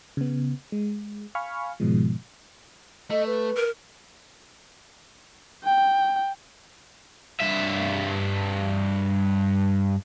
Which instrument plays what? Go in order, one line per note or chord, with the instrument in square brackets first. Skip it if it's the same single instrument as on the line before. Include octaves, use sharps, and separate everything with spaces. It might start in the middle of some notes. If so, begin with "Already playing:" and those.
[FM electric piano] C#3 B3
G#3
F5 G#5 B5 C#6 F6
G#2 B2 D#3 F3 G#3
[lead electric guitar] A3 [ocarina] D#5
[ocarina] B4
[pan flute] A#4
[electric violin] G5
[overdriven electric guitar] G2 E5